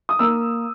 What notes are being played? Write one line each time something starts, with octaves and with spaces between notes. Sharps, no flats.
D#6
A#3 E6